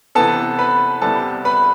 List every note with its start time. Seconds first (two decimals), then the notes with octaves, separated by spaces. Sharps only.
0.15 C3 E3 B3 A4 A5
0.59 B4 B5
1.02 C2 C3 G3 B3 A4 A5
1.45 B4 B5